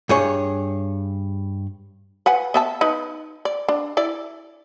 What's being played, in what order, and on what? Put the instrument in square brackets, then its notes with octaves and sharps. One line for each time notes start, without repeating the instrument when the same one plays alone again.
[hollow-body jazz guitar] G2 G#4 C#5
[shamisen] B4 F#5 G#5
B3 E5 A5
D#4 B4
D5
D4
E4 D5